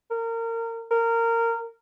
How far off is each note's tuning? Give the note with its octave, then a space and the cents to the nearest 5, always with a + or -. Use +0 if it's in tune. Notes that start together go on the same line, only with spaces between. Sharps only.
A#4 -25
A#4 -20